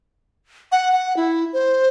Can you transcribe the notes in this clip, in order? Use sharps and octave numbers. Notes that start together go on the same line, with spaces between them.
F#5
F#5
E4
C5